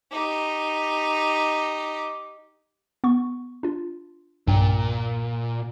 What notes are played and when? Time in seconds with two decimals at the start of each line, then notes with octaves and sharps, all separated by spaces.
0.12 D#4 G4
3.04 B3 C#6
3.63 D4 F4
4.47 B1 G2 A#2 G5